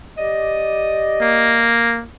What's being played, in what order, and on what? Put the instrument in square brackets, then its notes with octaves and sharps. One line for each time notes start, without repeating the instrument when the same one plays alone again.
[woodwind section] G4 D5 D#5
[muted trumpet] A#3